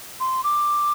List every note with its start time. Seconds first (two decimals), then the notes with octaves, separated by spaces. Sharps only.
0.20 C6
0.44 D6